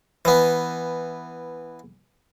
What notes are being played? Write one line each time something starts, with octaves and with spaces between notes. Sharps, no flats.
E3 B3